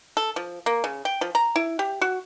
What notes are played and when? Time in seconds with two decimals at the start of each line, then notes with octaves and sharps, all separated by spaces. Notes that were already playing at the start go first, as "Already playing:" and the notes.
0.17 A4
0.36 F3
0.66 A#3
0.84 C#3
1.05 G5
1.21 F3
1.35 A#5
1.56 E4
1.79 G4
2.01 F#4